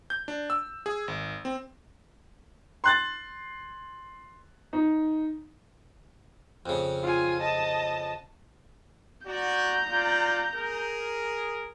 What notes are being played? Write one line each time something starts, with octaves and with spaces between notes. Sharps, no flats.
G6
D4
E6
G#4
G#1
C4
C6 F#6 A6
D#4
F2 C#3
F4 G#5
D#5 A5
F#4 D5 A#5 G6
F4 D5
G#4 A#4